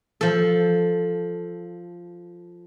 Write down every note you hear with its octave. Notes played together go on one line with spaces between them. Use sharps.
F3 A4